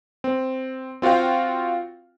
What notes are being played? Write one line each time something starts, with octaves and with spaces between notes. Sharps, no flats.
C4
C4 F4 F#4 F5 G5